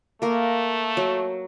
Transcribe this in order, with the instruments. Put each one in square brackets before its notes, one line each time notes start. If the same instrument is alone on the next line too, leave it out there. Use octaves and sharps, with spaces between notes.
[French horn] A3 [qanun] A#3 A#4
[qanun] F#3